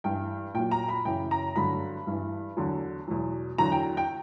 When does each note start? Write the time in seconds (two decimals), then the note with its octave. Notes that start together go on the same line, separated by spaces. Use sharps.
0.04 G2 E3 G5
0.54 A#2 F#3 G5
0.71 A#5
0.89 B5
1.05 F#2 C#3 E3 G5
1.31 A#5
1.56 G2 D3 F#3 B5
2.07 G2 E3
2.57 E2 D3 F#3
3.08 E2 B2 F#3
3.58 E2 D3 F#3 A#5
3.72 G5
3.97 G5